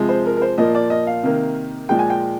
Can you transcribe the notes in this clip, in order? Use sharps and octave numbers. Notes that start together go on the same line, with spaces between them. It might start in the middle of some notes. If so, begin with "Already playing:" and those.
Already playing: C3 F3 G#3
C5
A#4
A#4
C5
A#2 F3 A#3 D#5
D5
D#5
F5
C3 D#3 A#3
A#2 F3 G#3 G5
G#5
G5